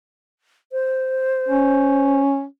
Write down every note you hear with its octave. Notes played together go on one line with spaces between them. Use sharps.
C5
C#4